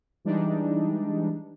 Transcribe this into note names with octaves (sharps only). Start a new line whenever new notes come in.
E3 G3 G#3 D4 D#4